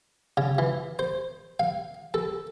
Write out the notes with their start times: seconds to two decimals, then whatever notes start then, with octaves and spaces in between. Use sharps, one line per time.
0.37 C#3
0.58 E3
0.99 C5
1.60 F5
2.14 A4